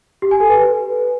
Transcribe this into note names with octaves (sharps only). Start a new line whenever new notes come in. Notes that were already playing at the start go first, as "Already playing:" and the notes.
G4
G#5
A4
B4